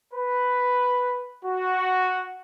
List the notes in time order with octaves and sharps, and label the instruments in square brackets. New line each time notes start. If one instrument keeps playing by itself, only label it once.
[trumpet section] B4
F#4